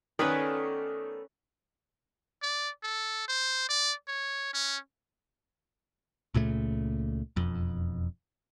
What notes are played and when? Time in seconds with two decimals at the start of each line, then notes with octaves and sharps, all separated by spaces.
0.19 D#3 A3 B3 C#4 B4 D5
2.42 D5
2.83 A4
3.28 C5
3.69 D5
4.08 C#5
4.54 C#4
6.34 C#2 A#2 C#3 A3
7.36 E1 F2